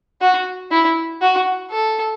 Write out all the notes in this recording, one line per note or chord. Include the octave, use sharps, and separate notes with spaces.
F#4
E4
F#4
A4